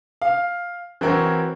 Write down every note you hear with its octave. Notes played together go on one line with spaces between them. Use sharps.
F5
E3 C4 E4 F#4 A#4 C#5